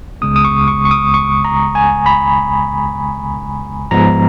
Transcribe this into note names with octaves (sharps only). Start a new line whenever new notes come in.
C#2 C#3 G#3 B3 D#6
D#6
C#6
C#6
C#6
D#6
C#6
A#5
G#5
B5
G#2 F3 G#3 B3 A#5